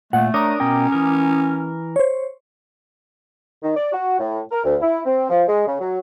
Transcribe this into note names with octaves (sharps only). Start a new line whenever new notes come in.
A#2 A3 F#5
D4 A#4 C#5 A#5 D6 D#6
B2 C#4 A#4 G5
E3 A#4
C5 C#5
D#3
D5
F#4
A2
A#4
D2
E4
C4
F3
G#3
C#3
F#3